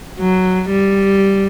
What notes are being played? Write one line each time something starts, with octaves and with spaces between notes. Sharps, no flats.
F#3
G3